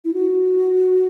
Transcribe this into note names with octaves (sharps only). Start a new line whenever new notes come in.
E4
F#4